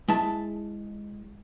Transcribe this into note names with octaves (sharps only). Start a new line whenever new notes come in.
G#3 E4 A5